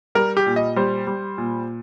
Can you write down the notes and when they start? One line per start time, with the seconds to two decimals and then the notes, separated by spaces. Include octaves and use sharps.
0.15 G3 A#4
0.37 G4
0.46 A#2
0.56 D#5
0.76 G3 C5
1.07 G3
1.38 A#2